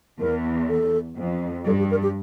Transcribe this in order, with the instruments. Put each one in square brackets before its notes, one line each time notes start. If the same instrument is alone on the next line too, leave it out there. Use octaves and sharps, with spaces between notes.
[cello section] E2 [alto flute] A#4
[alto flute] A4
[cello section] F2
[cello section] G2 [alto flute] A4
[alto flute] G4
A#4
G4